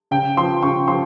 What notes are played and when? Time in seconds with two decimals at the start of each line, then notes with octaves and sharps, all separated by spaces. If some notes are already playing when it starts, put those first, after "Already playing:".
0.11 C#3 G5
0.37 F3 C6
0.63 C#3 C#6
0.88 F3 C6